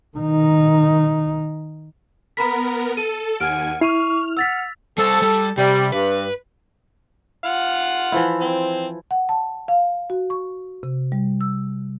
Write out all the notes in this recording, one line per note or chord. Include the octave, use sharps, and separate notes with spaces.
D#3 D#4
B3 A#4 A#5 B5 B6
A4 D#7
D#2 F#5 G#5 F6 D7
E4 C#6 F6 C7 D#7
F#5 E6 A6 B6
G3 A4 C5
G3
C3 G3
G2 B4
F4 F5 F#5
E3 F3 E4
C4
F#5
A5
F5
F#4
C#6
C3
G3
E6